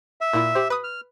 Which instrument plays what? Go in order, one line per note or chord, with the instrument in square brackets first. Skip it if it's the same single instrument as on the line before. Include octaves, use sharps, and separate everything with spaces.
[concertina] E5
[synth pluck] A#2 E4
G4 C5
B4 D#6
[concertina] F6